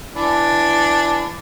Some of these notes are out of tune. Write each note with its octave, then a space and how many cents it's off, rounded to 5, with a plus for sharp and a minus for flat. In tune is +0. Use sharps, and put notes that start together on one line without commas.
E3 +30 D4 +0